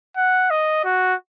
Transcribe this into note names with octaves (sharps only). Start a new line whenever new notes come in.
F#5
D#5
F#4